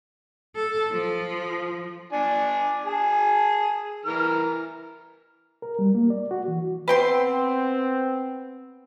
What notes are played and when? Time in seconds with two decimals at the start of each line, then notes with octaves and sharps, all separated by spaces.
0.55 A4
0.92 F3
2.12 D4 D5 G#5
2.86 G#4 A5
4.05 E3 A#4 F6
5.62 A#4
5.79 G3
5.95 A#3
6.10 D5
6.31 F#4
6.48 E3
6.88 B3 C4 B4 G5 C6